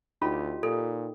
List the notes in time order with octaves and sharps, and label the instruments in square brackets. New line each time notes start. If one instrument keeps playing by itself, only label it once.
[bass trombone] D2 [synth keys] D#4 G4 [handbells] F4 [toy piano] B5
[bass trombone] A#2 [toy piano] A4